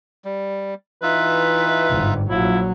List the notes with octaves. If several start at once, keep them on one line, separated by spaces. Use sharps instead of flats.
G3
E3 D#4 F4 B4 E5
G1 G#2
A#1 F#3 E4 F4